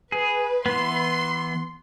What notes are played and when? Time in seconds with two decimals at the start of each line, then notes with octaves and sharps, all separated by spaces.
0.12 G#4 B4
0.66 E3 B3 C6